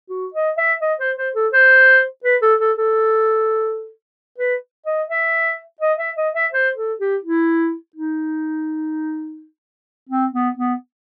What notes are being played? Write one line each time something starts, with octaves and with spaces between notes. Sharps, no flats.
F#4
D#5
E5
D#5
C5
C5
A4
C5
B4
A4
A4
A4
B4
D#5
E5
D#5
E5
D#5
E5
C5
A4
G4
E4
D#4
C4
B3
B3